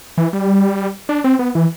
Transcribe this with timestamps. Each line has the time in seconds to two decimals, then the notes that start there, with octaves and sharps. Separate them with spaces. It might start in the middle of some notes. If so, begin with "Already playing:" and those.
0.18 E3
0.33 G3
1.09 D4
1.24 C4
1.39 B3
1.55 E3